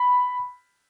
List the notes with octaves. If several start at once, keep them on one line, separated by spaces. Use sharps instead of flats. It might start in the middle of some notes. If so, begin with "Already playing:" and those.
Already playing: B5